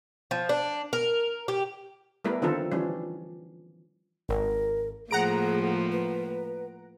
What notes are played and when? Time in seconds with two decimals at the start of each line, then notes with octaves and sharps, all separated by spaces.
0.31 F3
0.49 D4
0.93 A#4
1.48 G4
2.24 G3 A3 B3 E4 A#4 B4
2.42 D3 D#3 F3 C4 F4 A4
2.72 E3 F3 G3 C#4 D4
4.29 G#1 A#4
5.11 A2 F3 A#3 G#4 F#5 A#5 D7
5.92 B4